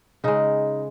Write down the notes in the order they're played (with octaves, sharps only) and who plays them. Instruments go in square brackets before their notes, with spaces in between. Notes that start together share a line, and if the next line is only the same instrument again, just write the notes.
[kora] C#3 G#3 D#4